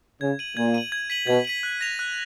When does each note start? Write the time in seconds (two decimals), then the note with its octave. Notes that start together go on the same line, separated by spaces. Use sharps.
0.21 C#3 G#6
0.39 D#7 F#7
0.56 A#2 G#6
0.74 D#7 F#7
0.92 G#6
1.10 B6 D#7 F#7
1.27 B2 G#6
1.45 B6 D#7 F#7
1.63 F#6
1.81 A#6 F7
1.99 F#6